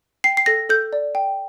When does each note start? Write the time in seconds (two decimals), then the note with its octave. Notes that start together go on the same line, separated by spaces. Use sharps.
0.24 G5 C7
0.37 C7
0.46 A4 A#6
0.69 A4 G6
0.93 D5
1.15 G5